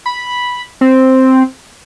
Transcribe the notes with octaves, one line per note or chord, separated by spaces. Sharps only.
B5
C4